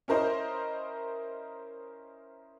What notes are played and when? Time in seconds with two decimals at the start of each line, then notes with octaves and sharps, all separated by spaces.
0.08 C#4 E4 A#4 C5 D#5